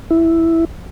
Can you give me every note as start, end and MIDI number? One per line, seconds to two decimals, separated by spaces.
0.11 0.65 64